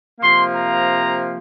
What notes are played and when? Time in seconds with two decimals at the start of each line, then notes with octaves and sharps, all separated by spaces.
0.20 C3 F3 A#3 C6
0.54 A#5